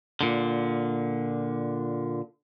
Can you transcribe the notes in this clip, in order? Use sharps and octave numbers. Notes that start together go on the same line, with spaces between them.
A#2 D3